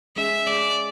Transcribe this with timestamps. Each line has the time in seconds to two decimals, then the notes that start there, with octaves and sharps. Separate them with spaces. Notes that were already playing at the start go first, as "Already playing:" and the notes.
0.16 G#3 C#4 G#4 E5
0.46 G#3 C#4 G#4 D5